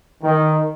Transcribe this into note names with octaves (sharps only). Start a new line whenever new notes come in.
D#3